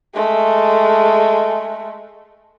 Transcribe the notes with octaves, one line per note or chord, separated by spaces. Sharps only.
G#3 A3